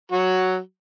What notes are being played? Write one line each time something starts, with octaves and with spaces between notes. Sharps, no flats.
F#3 F#4